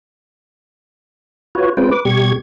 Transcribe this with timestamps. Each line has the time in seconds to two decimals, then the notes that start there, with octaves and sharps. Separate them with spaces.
1.55 F4 F#4 B4 C#5
1.77 G#3 C4 C#4 F4 B4 G5
1.91 B4 D6
2.05 B2 G3 G4 C#6 G#6